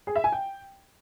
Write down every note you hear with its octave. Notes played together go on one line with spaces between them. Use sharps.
G#4
E5
G#5
G5